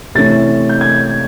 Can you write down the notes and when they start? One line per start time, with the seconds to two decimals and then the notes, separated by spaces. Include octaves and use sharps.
0.15 C3 E3 A3 C#4 A6
0.69 G6
0.81 G#6